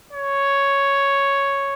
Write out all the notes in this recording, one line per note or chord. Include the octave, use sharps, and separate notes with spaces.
C#5